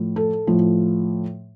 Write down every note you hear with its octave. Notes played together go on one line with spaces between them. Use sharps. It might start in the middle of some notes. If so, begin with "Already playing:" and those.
Already playing: A2 F3
A4
A2 F3